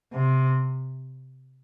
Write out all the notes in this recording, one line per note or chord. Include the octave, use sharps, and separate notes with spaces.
C3